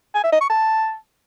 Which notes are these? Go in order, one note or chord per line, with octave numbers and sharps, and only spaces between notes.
G#5
E5
D#5
C#6
A5